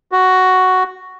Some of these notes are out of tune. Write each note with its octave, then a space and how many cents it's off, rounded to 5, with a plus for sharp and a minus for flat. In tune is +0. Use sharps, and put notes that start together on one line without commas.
F#4 +5